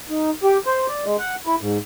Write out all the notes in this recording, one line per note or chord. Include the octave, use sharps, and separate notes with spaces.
D#4
G4
C5
D5
G#3
F#5
E4
G#2